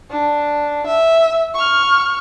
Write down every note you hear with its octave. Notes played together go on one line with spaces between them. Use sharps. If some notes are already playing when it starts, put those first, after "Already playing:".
D4
E5
C#6 F6